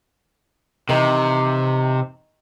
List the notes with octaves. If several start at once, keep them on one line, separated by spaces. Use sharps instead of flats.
C3 D#3 E3 B4